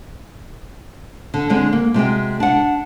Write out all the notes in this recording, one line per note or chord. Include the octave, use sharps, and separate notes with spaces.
D3
D3 G#3 C4
A#3
C3 G#3 F#4 G5
D4 F#5